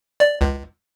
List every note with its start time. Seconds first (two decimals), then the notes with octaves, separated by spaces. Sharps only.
0.20 D5
0.41 C#2